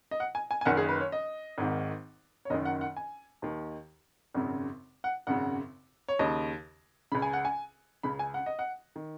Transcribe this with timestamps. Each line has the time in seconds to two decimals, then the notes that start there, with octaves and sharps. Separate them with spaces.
0.11 D#5
0.20 F#5
0.35 G#5
0.51 G#5
0.61 G#5
0.65 F#1 F#2 D#3 F#5
0.77 G#4
0.89 B4
1.00 C#5
1.12 D#5
1.58 G#1 G#2 D#3
2.45 C#5
2.50 F#1 F#2 D#3 D#5
2.65 F#5
2.81 F#5
2.97 G#5
3.42 D#2 D#3
4.34 G#1 F#2 C#3
5.04 F#5
5.27 G#1 F#2 C#3 F#5
6.08 C#5
6.19 D#2 C#3 D#5
7.12 C#2 C#3 B5
7.22 G#5
7.33 F#5
7.45 G#5
8.03 C#2 C#3 B5
8.19 G#5
8.34 F#5
8.46 D#5
8.59 F#5
8.96 D#3